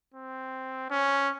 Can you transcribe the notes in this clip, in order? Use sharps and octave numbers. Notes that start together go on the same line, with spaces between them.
C4
C#4